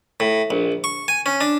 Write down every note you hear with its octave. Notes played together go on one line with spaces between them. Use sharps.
A2
A#1
C#6
G#5
C#4
D4